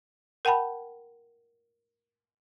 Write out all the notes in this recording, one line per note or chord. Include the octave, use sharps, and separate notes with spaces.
A#4 F#5 G5 A5 B5